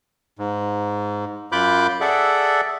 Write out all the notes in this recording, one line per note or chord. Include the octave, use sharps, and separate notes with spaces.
G#2
F#2 F4 B5 D6 F#6 G6
G#4 A4 D5 E5 F#5